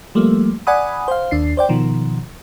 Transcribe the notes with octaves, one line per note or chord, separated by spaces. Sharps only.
F3 G3 A3 A#3
D5 F#5 G#5 B5 D#6
C5 F5
D#2 D4 C7
C5 D5 G5
B2 D#3 F3